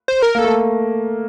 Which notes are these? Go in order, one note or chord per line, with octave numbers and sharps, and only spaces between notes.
C5
A#4
A#3 A4
A3